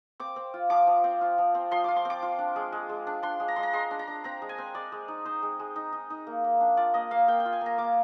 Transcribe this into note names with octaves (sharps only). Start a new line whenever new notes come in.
C4 D6
C4
F4
F3 D6
F3
C4
F4
F3
C4
F3 C6
F4 D6
C6
C4 D6
F4
D4
G#3
G#3
G#3
D4
D4 C6
G#3
A#5
G#3 C6
A#5
G#3 C6
D4
A#5
D4
C4 A#5
G#3
G#5
C4
G#3 D5
G#3
D#4
D#4 C5
G#3
G#3
D#4
D#4
D#4
A#3
A#3
D4
F4 D5
A#3 D#5
A#3 F5
A#3 G5
G5
F4
G#5
A#3 A#5
A#3 D6